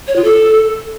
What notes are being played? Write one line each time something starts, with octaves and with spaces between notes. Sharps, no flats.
C#5
F4
A4